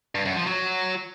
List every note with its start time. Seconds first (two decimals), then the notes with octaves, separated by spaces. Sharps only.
0.15 G2
0.25 F#2
0.36 F3
0.46 F#3